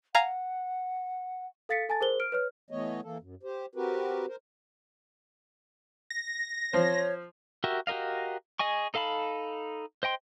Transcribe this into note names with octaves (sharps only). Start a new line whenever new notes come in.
F5 F#5 G#5 A#5
A4 F5 A6 B6 C#7
A4 G#5 A5 A6
G#4 A#4 C5 G7
F6 D7
B4 C#5 F6
E3 A3 B3 C#5 D#5
E3 A#3 A4
F#2
G4 C5
C4 F#4 G4 A#4 B4
A#4 C5
A#6
F3 C5 C#5
F#4 G4 A#4 E5
F#4 G4 A#4 D#5 F5
G#4 D#5 G#5 C#6
D#4 A4 F5 A5 B5
C5 D#5 G5 C6